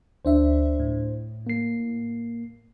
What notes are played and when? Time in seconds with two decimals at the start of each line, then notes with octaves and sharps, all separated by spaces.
0.25 D2 D4 C5 E5
0.79 A2
1.47 A#3 C7